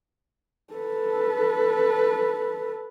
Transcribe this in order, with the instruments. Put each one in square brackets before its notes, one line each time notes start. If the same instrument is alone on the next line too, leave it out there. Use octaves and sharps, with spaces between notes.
[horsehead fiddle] A4 B4